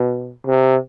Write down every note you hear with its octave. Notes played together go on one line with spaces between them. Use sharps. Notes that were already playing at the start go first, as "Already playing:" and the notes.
Already playing: B2
C3